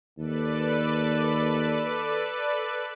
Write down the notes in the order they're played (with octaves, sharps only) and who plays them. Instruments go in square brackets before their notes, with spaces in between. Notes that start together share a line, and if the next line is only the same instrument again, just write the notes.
[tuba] D#2 [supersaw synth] A4 B4 D5